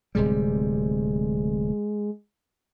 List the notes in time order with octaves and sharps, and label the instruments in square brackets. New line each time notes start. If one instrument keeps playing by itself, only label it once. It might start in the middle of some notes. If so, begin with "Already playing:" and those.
[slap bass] D1 C3 G3 [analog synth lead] G#3